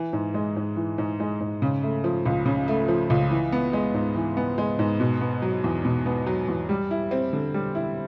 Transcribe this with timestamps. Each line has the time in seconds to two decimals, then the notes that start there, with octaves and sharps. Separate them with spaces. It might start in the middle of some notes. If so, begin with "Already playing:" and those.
Already playing: E3
0.13 G#2
0.34 G#3
0.56 G#2
0.76 E3
0.98 G#2
1.20 G#3
1.41 G#2
1.62 C#3
1.83 A3
2.04 F3
2.26 C#2
2.46 C#3
2.68 A3
2.88 F3
3.10 C#2
3.31 E3
3.52 B3
3.73 G#3
3.94 G#2
4.16 E3
4.37 B3
4.58 G#3
4.79 G#2
5.00 B2
5.21 B3
5.42 F#3
5.64 E2
5.85 B2
6.06 B3
6.27 F#3
6.48 E2
6.69 G3
6.91 E4
7.11 C4
7.33 D3
7.54 G3
7.75 E4